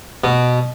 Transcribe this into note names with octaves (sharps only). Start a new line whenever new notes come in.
B2